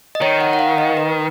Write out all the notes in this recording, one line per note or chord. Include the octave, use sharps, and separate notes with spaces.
D#5
D#3 C#5
F#5
F#5
F5
D#5
B4